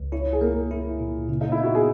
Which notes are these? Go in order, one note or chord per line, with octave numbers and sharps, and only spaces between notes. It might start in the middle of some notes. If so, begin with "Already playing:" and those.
Already playing: C#2
E4 C#5
G#4
A#3 A#4
E4
A#2
C#3
D#4
E4
B3
F#4
G#4